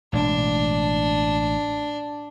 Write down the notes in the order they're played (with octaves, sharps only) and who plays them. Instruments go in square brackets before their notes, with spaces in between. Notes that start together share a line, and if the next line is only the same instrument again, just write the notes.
[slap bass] A1 B2 G#3 [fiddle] D4